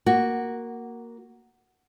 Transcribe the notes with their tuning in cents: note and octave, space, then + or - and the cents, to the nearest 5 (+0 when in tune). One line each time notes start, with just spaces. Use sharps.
A#3 +0 F#4 +0